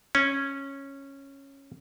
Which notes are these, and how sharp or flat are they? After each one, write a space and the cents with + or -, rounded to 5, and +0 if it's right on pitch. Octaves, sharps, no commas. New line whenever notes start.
C#4 -10